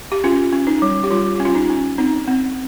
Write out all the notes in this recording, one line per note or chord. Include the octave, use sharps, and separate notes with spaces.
G4
C#4 F4
C#4
D#4
G3
G4
G3 F4
C#4 G4
F4
D#4
C#4
C4 D#4
C4